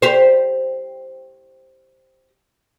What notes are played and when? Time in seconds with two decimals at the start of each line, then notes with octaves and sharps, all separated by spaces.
0.02 G4 C5